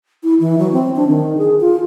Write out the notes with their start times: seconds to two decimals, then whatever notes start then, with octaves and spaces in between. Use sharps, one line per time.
0.23 E4
0.40 E3
0.58 F#3
0.72 C4
0.96 D4
1.08 D#3
1.38 G#4
1.61 F4